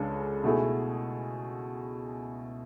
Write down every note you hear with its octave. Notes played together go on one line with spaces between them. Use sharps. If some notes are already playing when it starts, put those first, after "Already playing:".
Already playing: C#2 C#3 G#3 D4 A4
B2 A3 E4 G#4